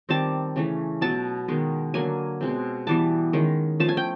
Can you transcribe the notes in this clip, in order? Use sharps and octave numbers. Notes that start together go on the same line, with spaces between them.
D#3 G3 C4 A5
C#3 E3 A3 C#4
B2 F#3 B3 A5
D#3 G#3 B3
D3 F#3 A#3 G#5
B2 G#3 C4
E3 G3 B3 A5
D#3 G#3 C#4
F3 A3 C#4 A5
G#5
G5